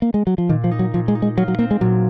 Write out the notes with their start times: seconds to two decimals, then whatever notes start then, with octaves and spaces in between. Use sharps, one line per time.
0.02 A#3
0.14 G#3
0.27 F#3
0.38 F3
0.49 A#2 D#3
0.64 F3
0.71 D#4
0.79 F#3
0.94 A#2 F3
1.08 G#3
1.15 D#4
1.22 G#3
1.37 F#3 F4
1.48 F#3
1.59 A#3 C4
1.71 G#3
1.81 A#2 F#3